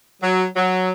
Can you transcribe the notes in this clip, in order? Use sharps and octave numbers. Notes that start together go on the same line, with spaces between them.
F#3
F#3